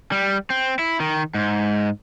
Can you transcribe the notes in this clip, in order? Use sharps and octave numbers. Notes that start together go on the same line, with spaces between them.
G3
C4
E4
D#3
G#2